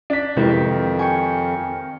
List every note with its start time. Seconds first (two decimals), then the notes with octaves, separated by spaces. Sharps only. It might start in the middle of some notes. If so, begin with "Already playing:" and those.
0.10 D4 B6
0.37 F2 C3 D#3 G#3 E4 G4 B4
0.99 G5 G#5 C#6 C#7